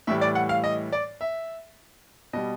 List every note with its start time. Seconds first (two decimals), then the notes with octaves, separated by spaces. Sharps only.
0.07 A2 E3 G3 E5
0.21 D5
0.35 F#5
0.49 F5
0.64 D#5
0.92 D5
1.21 E5
2.33 B2 G3 D#5